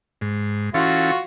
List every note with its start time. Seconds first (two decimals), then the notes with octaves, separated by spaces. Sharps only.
0.21 G#2
0.74 E3 C#4 F4 F#4 A4